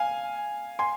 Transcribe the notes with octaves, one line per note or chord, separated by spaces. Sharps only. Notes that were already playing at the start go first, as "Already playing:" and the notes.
Already playing: F5 G#5
G#5 C6